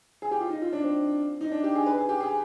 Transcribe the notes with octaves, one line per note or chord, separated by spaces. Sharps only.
G#4
G4
F4
D#4
F4
D4
C4
D#4
D4
G4
G#4
B4
G#4
G4
G#4